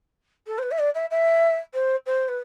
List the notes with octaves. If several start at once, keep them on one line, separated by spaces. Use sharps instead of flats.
A4
C5
B4
E5
D5
E5
E5
C5
C5
B4